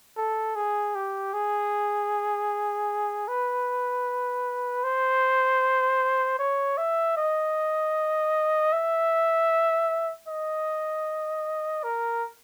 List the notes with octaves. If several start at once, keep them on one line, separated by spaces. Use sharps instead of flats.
A4
G#4
G4
G#4
B4
C5
C#5
E5
D#5
E5
D#5
A#4